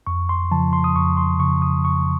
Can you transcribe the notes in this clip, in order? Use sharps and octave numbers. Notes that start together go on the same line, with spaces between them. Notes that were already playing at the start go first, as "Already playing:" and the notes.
F2 C#6
C6
C#3 F3 A5
C6
D#6
F2 C#6
C6
C#3 F3 C#6
D#6
F2 C#6